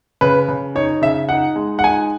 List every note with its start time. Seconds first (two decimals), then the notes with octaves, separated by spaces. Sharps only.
0.21 C#3 B4
0.48 C#3
0.75 D#4 C#5
1.02 C#3 E5
1.29 D#4 F#5
1.56 G#3
1.79 F#5
1.84 D#4 G#5